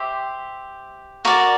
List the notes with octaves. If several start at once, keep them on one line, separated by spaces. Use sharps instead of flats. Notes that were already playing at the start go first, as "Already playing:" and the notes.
Already playing: G4 C5 E5
F#4 A#4 D5